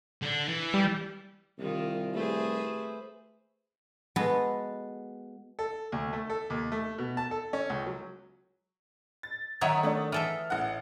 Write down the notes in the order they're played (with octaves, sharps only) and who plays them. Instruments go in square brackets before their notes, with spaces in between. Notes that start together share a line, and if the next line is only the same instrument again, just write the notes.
[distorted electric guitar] D3 D4
E3
[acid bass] G3
[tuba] C2 [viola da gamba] D#3 [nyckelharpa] F4 G4
[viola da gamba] A3 G#4 [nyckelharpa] B4 C5
[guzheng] G#3 B3 F#4 A4
[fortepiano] A4
D2
A3
A4
D#2
A3
B2
A5
A4
C#4
C#2
F#3
[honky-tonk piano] A6
[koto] D#3 F#3 C#5 [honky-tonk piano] E5 F#5 D#6
[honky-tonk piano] A3 D4
[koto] E3 A4 E5 [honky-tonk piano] F6
[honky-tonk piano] A1 F#5